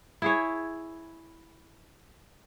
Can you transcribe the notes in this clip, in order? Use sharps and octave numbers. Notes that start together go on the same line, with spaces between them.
E4 G#4 C#5